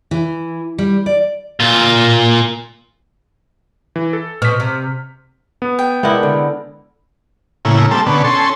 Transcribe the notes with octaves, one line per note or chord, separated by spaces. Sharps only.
E3
G3
D5
A#2 F4
E3
A4
B2 C4 F6 B6
C3
B3
G5
G#3 B3 D4 E4 A#4
D3
A2 C#3 A#3 E4
G3 A3 A#3 C4 A4
B2 D3 B3 C#4
C#4 A4 C6